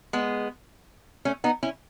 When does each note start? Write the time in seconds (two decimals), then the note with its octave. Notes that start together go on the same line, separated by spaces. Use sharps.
0.13 G#3 B3
1.25 A3 C#4
1.44 B3 D#4
1.63 C#4 E4